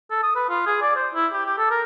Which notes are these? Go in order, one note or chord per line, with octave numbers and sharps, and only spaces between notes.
A4
D#6
B4
F4
G#4
D5
C5
E4
G4
G4
A4
A#4